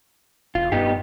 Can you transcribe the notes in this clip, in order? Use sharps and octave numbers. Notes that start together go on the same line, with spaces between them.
E1 F4
G2 B3 D#4 G4